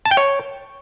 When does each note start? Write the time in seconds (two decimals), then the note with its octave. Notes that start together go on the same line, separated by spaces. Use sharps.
0.05 A5
0.11 G5
0.17 C#5